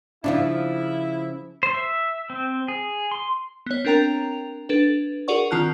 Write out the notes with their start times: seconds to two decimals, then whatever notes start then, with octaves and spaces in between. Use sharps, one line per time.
0.24 C#3 F3 D4 E4 F4
1.63 C5
1.74 E5
2.30 C4
2.68 G#4
3.11 C6
3.66 B3 C#5
3.85 C4 D4 A#4 G5 A#5 F7
4.69 D4 A4 B4
5.28 F#4 G#4 A#4 D5 F#5 C#6
5.51 D#3 C4 F4 A5 F6 F#6